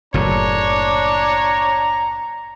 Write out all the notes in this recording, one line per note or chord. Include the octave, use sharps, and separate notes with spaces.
F#1 A2 D4 C#5 A#5